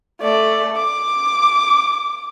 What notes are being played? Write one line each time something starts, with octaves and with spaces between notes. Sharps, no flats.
A3 D5
D6